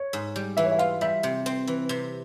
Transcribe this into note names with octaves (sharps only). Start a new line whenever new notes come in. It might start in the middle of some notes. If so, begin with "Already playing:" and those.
Already playing: C#5
G#2
G3
E3 E5
C#5
E5
F4 F5
G3 E5
C3
C4
E3
C3